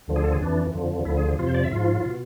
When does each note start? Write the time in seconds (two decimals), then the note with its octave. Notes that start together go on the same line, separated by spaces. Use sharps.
0.08 D2 D3 F3
0.16 G#4
0.24 A4
0.32 G#4
0.40 F2 E3 D4
0.74 F2 D3 F3
1.05 D2 D3 F3 E4
1.17 G#4
1.28 G#4
1.39 F2 C3 F3 F4
1.47 C5
1.54 D5
1.63 E5
1.71 G#2 F3 F4
2.06 B2